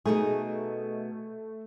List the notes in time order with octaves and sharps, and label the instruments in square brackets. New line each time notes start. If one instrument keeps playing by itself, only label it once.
[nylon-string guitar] B2 D#4 G#4 [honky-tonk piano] A3